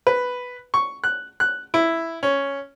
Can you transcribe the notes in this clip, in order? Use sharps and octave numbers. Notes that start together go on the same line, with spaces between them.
B4
C#6
F#6
F#6
E4
C#4